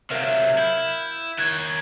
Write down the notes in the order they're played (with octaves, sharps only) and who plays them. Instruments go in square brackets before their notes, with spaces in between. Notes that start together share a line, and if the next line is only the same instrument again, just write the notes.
[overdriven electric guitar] C3 F#3 [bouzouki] A#4 E5 F5
[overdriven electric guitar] E4 [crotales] G6 E7
[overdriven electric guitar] D#3 C#5 [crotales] F#6 G#6